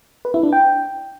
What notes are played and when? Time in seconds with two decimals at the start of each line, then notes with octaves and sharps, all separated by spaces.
0.25 B4
0.34 E4
0.43 D4
0.53 G5